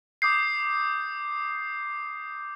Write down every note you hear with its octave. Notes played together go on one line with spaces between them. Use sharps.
D6 D#6 G6 C7